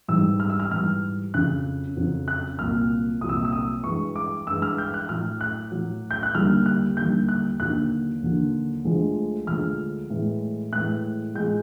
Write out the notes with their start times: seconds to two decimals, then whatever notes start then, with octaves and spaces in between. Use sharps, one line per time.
0.08 G#2 E3 G3 E6
0.40 F6
0.50 E6
0.60 F6
0.71 G#2 E3 G3 F6
1.34 F2 C#3 F#3 F#6
1.96 F2 C#3 F#3
2.28 F#6
2.59 C2 A#2 F#3 F6
3.21 C2 A#2 F#3 D#6
3.29 E6
3.37 D#6
3.45 E6
3.52 D#6
3.84 G2 E3 G#3 C#6
4.16 D6
4.46 G2 E3 G#3 E6
4.62 F6
4.78 G6
4.94 F#6
5.09 A2 F#3 F6
5.41 F#6
5.72 A2 F#3
6.11 G6
6.23 F#6
6.35 D#2 D3 G3 F6
6.66 F#6
6.97 D#2 D3 G3 G6
7.29 F#6
7.60 D#2 D3 F#3 F#6
8.22 D#2 D3 F#3
8.85 D2 D3 F3 G#3
9.47 D2 D3 F3 G#3 F6
10.10 A2 E3 G#3
10.72 A2 E3 G#3 F#6
11.35 A2 F3 G#3 G6